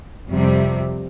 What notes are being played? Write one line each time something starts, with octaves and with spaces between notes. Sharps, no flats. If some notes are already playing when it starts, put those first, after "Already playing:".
F2 C3 G3